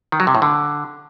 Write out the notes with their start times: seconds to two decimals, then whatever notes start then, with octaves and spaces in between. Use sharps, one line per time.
0.12 D#3
0.20 F#3
0.27 C3
0.35 A2
0.42 D3